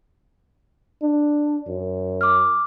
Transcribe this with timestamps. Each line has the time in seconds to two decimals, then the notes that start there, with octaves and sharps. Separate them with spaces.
1.02 D4
1.68 F#2
2.21 D6 F6